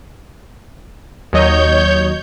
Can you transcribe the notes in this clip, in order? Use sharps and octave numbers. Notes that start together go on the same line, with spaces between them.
D#2 F#3 C#5 D#5 G6